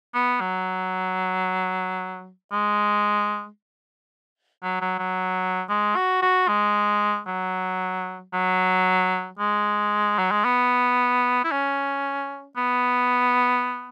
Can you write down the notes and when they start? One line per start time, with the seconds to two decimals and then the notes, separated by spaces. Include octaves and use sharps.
0.14 B3
0.41 F#3
2.52 G#3
4.63 F#3
4.81 F#3
4.99 F#3
5.69 G#3
5.96 F#4
6.22 F#4
6.48 G#3
7.27 F#3
8.33 F#3
9.39 G#3
10.18 F#3
10.31 G#3
10.45 B3
11.44 E4
11.51 C#4
12.57 B3